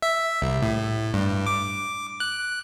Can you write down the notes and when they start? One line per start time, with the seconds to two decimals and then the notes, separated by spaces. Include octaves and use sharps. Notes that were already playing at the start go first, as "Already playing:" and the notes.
0.03 E5
0.42 C2
0.62 A2
1.14 G2
1.46 D6
2.20 F#6